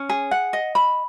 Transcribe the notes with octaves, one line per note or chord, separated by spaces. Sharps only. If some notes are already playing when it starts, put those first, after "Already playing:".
Already playing: C#4
G#4
F#5
D#5
B5